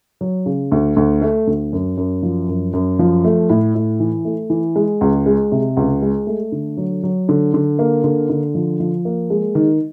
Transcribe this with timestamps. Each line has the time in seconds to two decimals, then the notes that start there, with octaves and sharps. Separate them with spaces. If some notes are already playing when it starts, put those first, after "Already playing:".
0.21 F#3
0.46 C#3
0.71 D2
0.96 D2
1.22 A3
1.47 D2
1.73 F#2
1.97 F#2
2.23 F3
2.48 F#2
2.73 F#2
2.99 F3
3.25 A3
3.49 A2
3.75 A2
4.00 E3
4.25 A3
4.50 E3
4.76 G#3
5.01 C#2
5.26 G#3
5.52 C3
5.77 C#2
6.02 G#3
6.27 A3
6.52 D3
6.77 F#3
7.03 F#3
7.29 D3
7.54 D3
7.79 A#3
8.04 D3
8.30 D3
8.55 F3
8.80 F3
9.05 A#3
9.30 G#3
9.55 D#3